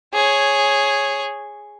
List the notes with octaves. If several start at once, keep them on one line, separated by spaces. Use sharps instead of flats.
G#4 C#5